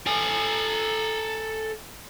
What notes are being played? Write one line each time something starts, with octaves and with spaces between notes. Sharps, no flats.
A4 G#5